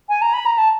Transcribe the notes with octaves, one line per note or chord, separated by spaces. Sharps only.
G#5
A#5
B5
A#5
A5